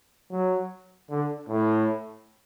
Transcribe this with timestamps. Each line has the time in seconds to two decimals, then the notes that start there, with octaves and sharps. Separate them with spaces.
0.31 F#3
1.10 D3
1.48 A2